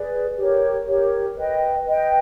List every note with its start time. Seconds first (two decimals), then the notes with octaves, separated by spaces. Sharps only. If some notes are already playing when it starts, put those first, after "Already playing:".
Already playing: G#4 B4 D5
0.37 G4 A#4 C#5
0.86 G4 A#4 C#5
1.36 B4 D#5 G5
1.85 B4 D#5 G5